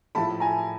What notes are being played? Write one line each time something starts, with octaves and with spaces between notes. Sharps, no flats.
A2 F3 A3 A5 B5
G#5 A#5